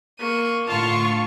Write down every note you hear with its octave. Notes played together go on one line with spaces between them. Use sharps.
A#3 C#6 D#7
A2 D3 F4 A5 C#6 F6